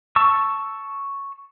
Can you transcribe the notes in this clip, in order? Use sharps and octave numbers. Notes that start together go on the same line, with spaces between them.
A5 C#6 E6